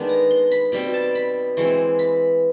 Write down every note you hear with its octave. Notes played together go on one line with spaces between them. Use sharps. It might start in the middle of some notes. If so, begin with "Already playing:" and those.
Already playing: D#3 G#3 B3 D4
A#5
C6
B5
B2 G3 C4 B5
A5
B5
E3 G#3 C4 C6
B5